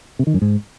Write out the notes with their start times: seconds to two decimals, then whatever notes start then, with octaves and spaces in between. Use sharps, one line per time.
0.19 C3
0.27 D#3
0.34 F#2
0.42 G#2